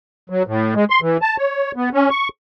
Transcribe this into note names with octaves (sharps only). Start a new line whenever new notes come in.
F#3
A2
G#3
C6
E3
A5
C#5
B3
C#4
C#6